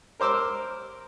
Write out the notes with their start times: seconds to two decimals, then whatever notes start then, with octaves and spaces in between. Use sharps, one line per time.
0.20 A#4 C5 D6 E6 F6